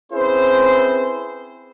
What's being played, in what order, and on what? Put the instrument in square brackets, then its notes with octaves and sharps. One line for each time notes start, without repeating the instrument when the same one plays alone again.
[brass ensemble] C4 C#4 E4 G#4 B4 C5